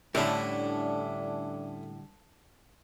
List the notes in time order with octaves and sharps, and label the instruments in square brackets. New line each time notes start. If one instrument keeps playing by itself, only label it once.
[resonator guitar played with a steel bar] A2 [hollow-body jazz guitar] D3 G3 [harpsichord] A3 C#4 E4 [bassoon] D4